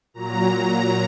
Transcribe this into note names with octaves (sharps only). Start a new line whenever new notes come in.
A#2 F#3 A#5